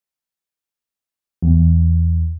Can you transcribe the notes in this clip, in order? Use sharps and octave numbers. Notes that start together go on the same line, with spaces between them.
E2